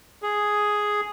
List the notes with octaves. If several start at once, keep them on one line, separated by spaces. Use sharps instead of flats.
G#4